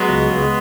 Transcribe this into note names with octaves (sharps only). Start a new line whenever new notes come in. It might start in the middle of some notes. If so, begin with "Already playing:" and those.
Already playing: F#3 G#3 B3
C#2
C#2